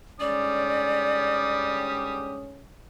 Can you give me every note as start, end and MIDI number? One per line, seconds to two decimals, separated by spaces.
0.20 2.67 44
0.20 2.67 50
0.20 2.45 55
0.20 2.67 61
0.20 2.45 67
0.20 1.84 74
0.20 2.45 87